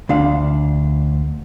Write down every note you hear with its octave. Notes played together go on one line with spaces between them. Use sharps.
D2 D4 F5